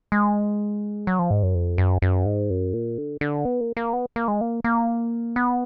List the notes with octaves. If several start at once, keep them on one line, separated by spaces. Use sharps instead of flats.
G#3
F#3
F3
G#2
F#2
F2
F#2
F#2
G#2
F#2
A#2
D3
D3
B3
A#3
A#3
B3
A#3
G#3
A#3
A#3
B3